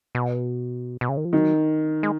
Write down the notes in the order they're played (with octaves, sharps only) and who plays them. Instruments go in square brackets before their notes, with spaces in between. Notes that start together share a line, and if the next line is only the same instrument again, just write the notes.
[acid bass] B2
B2
C#3
D#3
F3
[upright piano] D#3 [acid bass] F#3
[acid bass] G#3